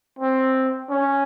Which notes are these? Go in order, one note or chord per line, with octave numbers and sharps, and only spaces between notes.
C4
C#4